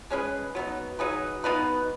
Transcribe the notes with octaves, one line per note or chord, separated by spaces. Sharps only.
G#3 C#4 G#4 B4
F#3 B3 D#4
F#3 D#4 G#4 B4
B2 B3 D#4 B4